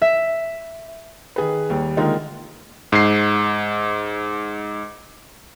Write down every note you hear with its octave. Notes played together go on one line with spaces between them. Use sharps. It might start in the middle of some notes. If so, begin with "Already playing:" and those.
E5
D#3 G#4 B4
D#2 G3
D3 D#3 G#3 A#3 D#4 F4
G#2 C7